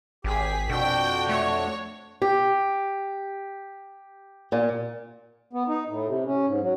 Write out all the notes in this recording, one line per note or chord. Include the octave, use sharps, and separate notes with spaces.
G#1 G4 G#4 B6
F2 B2 D4 F#4 G5
A3 C#5
G4
A#2
B3
D#4
A2
C3
C#4
G#2
F#3